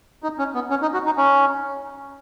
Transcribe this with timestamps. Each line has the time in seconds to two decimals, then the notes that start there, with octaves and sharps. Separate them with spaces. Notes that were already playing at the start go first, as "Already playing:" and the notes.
0.23 D#4
0.39 C#4
0.55 B3
0.70 C#4
0.82 D#4
0.94 F#4
1.06 D#4
1.17 C#4